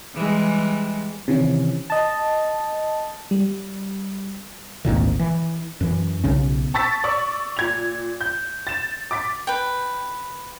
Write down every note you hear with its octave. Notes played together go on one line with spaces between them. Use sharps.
E3 G3 G#3
C3 D#3 E3 C#4
D#5 A5
G3
G#1 D2 A#2 D#3
E3
F#2 E3
B1 C#3 C#4
A5 C#6 E6 A6 B6
D5 C#6 E6
A#2 G#6 F7
G6
A6 E7
D6 A6 B6
B4 G5